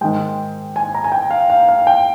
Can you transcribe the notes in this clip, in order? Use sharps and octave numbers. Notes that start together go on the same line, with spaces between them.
G#2 D#3 G#3 G5
G#5
A#5
G#5
G5
F5
F5
F5
G5